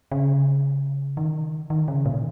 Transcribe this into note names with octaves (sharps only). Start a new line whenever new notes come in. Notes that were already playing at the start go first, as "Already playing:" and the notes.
C#3
D#3
D#3
C#3
A#2